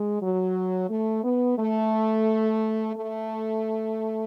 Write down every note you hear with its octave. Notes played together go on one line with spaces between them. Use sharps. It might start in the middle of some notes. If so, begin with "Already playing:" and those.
Already playing: G#3
F#3
A3
B3
A3
A3